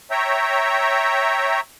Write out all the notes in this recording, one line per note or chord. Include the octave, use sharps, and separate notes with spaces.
C#5 E5 G5 A#5